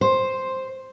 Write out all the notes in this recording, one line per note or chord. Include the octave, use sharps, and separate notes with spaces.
C5